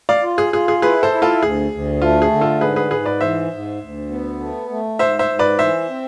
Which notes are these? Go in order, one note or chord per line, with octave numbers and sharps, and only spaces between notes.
D5 F5
F4
G#4
F4 G#4
G#4
E4 G#4 B4
A4 C5
E4
F4 A4
D2 G#4
D2
A3 F4
G#4
D3
F4 A4
G#2 G#4 B4
G#4 B4
G#2 G#4 B4
B4 D5
E3 C5 E5
G#2
D2
B3
A3
A3
G#2 C5 E5
C5 E5
G#2
B4 D5
E3 C5 E5
C4